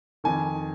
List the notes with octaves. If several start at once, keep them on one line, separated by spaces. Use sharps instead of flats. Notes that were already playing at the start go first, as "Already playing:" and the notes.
F2 D#3 G#5